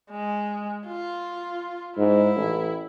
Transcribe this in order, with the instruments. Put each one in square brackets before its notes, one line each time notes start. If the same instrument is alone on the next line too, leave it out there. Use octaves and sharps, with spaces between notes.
[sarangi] G#3
F4
[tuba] G#2 [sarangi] E4
[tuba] A1